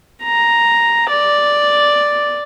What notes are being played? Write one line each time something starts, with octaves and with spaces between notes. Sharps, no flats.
A#5
D5